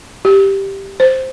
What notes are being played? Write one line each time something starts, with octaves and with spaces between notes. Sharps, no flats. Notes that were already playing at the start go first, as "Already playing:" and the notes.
G4
C5